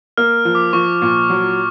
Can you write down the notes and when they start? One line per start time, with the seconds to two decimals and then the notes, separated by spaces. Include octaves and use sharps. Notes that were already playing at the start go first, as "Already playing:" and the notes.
0.17 A#3 F6
0.45 F3
0.55 D6
0.73 F3 C#6
1.02 A#2
1.30 F#3